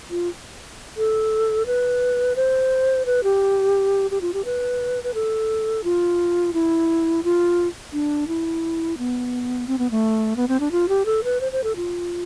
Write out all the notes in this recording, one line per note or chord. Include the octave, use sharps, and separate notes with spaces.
F4
A4
B4
C5
B4
G4
G4
F4
G4
B4
B4
A4
F4
E4
F4
D4
E4
B3
C4
B3
A3
B3
C4
D4
F4
G4
A4
B4
C5
C5
A4
F4